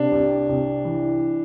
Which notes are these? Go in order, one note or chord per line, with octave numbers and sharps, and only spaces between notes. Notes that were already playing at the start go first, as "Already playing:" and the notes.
Already playing: C3 D4
C2
C2
E3